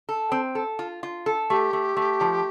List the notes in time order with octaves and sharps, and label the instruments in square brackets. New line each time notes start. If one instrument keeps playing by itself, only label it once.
[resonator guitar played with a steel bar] A4
C4
A4
F4
F4
A4
[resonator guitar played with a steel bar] A3 [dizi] G4
[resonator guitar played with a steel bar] A3
A3
F3